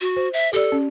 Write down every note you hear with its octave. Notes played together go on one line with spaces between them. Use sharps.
F#4
C5
E5
G4 A4 D5
C#4